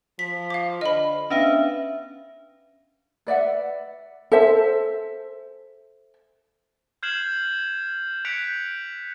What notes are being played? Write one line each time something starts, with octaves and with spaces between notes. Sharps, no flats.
F3 B6
F5 D6
D3 C5 D#5 B5
B3 C#4 D4 E5 F5
B4 D5 E5 F#5
A4 C5 E5
F6 G6 G#6 C7 E7 F#7
F#6 G6 B6 C#7 D7 F7